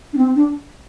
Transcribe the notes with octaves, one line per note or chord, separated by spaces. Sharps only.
D4
C4
D4